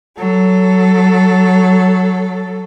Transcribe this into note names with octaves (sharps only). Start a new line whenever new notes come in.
F#3 A4